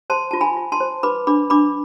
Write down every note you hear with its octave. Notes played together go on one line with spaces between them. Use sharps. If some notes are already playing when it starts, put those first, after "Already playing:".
C5 A5 C6
F4 A5
G#5 B5
F4
A5 C6
C5
B4 B5 D6
D4 B5 D6
D4 B5 D6